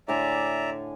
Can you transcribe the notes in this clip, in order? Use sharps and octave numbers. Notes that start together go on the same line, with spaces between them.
A2 D3 D5 E5 G#5 A#5